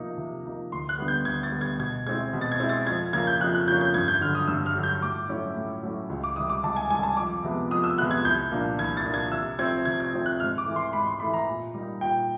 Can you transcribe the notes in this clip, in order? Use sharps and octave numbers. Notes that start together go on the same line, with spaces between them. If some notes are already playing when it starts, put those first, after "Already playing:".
Already playing: C3 F3 A#3 D#4
C3
F3 A#3 D#4
D2 C6
F#6
D3 G3 B3
G6
D2 G#6
A6
D3 G3 B3
G#6
B2 G#6
G#3 C4 E4 G#6
B2
A6
G#6
G#3 C4 E4
A6
F2 G#6
C#3 F3 A#3 C#4 G#6
G6
F2 F#6
F#6
C#3 F3 A#3 C#4 G6
G6
G2 G#6
G6
D3 F#3 F6
D#6
G2 E6
F6
D3 F#3
G6
A2 D6
F#3 A3 C#4 E4
A2
F#3 A3 C#4 E4
C#2
D6
C3 D#3 G3 D#6
D6
C#2 A5
G#5
C3 D#3 G3 G#5
A5
F2 D6
C3 F3 G#3 B3
F2 D#6
E6
C3 F3 G#3 B3 F#6
G#6
C2 G6
A#2 F3 A#3 D4
C2 G#6
A6
A#2 F3 A#3 D4
G#6
C3 E6
F3 A3 C4 G#6
C3 G#6
G#6
F3 A3 C4
F#6
G#2 F6
D6
E3 A3
C6
G#2 B5
C6
E3 A3 B5
A#5
A#2
G3 A#3 D#4
A#2 G5